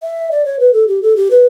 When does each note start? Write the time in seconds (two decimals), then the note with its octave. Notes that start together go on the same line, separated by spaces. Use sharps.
0.03 E5
0.31 D5
0.45 C#5
0.60 B4
0.73 A4
0.88 G4
1.02 A4
1.16 G4
1.31 B4